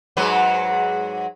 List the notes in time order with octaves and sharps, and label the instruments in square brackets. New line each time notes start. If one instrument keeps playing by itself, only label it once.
[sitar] G#2 F#3 B4